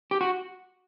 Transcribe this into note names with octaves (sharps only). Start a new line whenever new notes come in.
G4
F#4